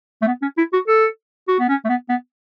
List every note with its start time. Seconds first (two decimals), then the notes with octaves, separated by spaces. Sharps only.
0.22 A3
0.27 B3
0.42 C#4
0.58 E4
0.73 F#4
0.88 A4
1.48 F#4
1.59 B3
1.69 C#4
1.85 A3
1.89 B3
2.09 B3